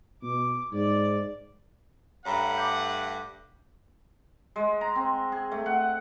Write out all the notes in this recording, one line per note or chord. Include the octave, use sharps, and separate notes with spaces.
B2 D6
G#2 D5
G2 A3 C#5 F#5 A#5 B5
D6 G6
G#3
A#5
C4
G#4
A3
F#5